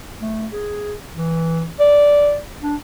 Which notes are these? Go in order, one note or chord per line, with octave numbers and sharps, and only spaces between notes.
A3
G#4
E3
D5
D4